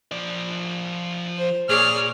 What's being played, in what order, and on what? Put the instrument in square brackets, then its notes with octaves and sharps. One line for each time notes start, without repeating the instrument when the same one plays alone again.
[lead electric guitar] F3 D5
[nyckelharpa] C5
[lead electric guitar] A#2 [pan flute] G#4 [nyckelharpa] C#5 D5 [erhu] F6